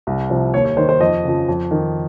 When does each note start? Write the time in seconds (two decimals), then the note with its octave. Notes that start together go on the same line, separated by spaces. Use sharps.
0.07 C2
0.30 C3 F3
0.54 D#2 C#5
0.65 C#5
0.77 D#3 C5
0.89 C5
1.00 F2 D#5
1.24 C#3 F3
1.48 F2
1.71 D#3